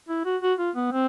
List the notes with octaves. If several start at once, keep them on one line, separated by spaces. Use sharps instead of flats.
E4
F#4
F#4
F4
B3
C4